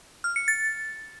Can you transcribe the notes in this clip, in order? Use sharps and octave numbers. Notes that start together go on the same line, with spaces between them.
F6
C#7
A6